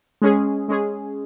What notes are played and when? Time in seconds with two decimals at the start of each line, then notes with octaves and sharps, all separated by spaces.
0.22 G#3 C#4 G#4
0.68 G#3 C#4 G#4